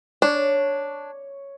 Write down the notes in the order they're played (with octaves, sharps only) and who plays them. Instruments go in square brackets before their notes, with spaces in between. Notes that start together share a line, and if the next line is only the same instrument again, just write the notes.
[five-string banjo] D4 [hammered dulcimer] C#5